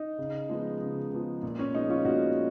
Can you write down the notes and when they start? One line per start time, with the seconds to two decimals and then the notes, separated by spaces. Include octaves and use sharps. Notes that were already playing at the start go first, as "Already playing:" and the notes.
Already playing: D#4
0.18 C#3
0.49 F3 G#3 B3
0.81 C#3
1.11 F3 G#3 B3
1.43 A#2
1.59 C#4
1.74 F3 G#3 B3 D#4
1.90 C#4 F4
2.05 A#2 D#4 F#4